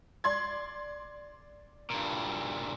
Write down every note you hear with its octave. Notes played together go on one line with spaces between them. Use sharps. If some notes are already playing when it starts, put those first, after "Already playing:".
D5 C6 G#6
G2 A#2